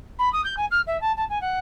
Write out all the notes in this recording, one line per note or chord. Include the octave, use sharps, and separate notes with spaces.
B5
D#6
G6
G#5
F6
E5
A5
A5
G#5
F#5